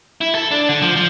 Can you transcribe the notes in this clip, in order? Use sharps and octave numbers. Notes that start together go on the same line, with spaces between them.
E4
A4
D4
D3
F3
F3